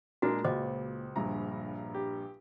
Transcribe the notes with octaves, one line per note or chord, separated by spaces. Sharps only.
A#2 G#3 A#3 D4 F#4
C#2 C5 D#5 D6
A#1 G2 A#5
G4